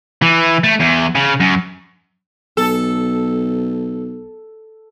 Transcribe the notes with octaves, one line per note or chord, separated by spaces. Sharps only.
E3
A3
E2
C#3
F#2
B1 A4